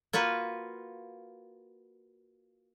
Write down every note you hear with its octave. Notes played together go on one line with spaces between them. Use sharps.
A#3 F4 F#4 B4